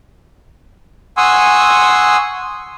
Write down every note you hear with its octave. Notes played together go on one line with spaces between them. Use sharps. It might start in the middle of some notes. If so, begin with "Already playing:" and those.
F#5 G#5 C6 C#6 D#6 E6